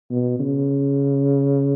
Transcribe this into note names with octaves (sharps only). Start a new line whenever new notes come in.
B2
C#3